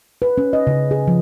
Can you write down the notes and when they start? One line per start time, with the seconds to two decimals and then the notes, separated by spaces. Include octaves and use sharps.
0.22 B4
0.38 C#4
0.53 D#5
0.67 C#3
0.91 G#4
1.08 F3